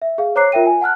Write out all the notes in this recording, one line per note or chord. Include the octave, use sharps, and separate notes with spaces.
E5
G#4 F5
C5 C#5 A#5 D6 F#6 C7
F4 A#4 E5 G5 D#7
G#5
F#5 A5 F6 F#6